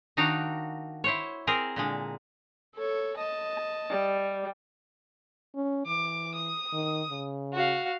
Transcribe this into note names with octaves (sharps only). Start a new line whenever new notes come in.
D#3 D4 D#4 F#4 F5 A#5
E4 C5 C#5
C4 G#4 A#4 C5
A#2 D3 G#3
A4 C#5
D#5 A5
G3
C#4
E3 D6
D#6
D#3
C#3
F#4 F5